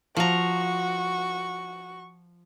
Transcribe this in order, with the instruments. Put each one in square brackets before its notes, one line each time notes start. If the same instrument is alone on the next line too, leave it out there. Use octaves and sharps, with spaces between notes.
[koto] F3 A#5 [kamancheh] F#4 C#6